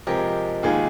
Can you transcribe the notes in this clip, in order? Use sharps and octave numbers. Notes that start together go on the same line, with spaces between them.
C3 F3 G#3 G4 A#4
D#2 D#3 G#3 F4 G#4